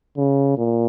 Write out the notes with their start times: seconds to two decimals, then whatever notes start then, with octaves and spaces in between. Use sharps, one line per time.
0.17 C#3
0.58 A#2